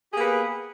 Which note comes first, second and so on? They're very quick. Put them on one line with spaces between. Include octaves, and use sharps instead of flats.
G4 G#4 A#3 B3